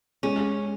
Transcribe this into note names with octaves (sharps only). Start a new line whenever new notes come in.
G#3 C#4